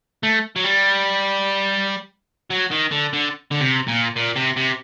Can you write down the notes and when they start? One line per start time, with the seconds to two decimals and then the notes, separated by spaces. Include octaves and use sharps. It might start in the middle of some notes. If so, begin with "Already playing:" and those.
0.23 A3
0.56 F#3
0.64 G3
2.50 F#3
2.71 D#3
2.91 D3
3.13 D3
3.51 D3
3.60 C3
3.88 A#2
4.16 A#2
4.36 C3
4.57 C3